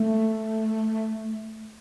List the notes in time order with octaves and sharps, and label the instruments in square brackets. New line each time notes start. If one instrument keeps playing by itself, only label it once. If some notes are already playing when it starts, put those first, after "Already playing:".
Already playing: [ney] A3